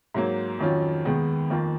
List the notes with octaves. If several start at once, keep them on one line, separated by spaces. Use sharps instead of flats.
G#2 F#3 A#3
F2 D#3 F#3 C#4 F4
D#2 D#3 G#3 B3
F2 D#3 A#3 F4